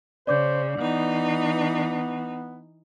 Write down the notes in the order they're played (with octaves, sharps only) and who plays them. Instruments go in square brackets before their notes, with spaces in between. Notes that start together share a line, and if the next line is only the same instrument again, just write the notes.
[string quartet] C#3 [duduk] C5 [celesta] D5 D6 G6
[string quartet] E3 D#4 [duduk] B3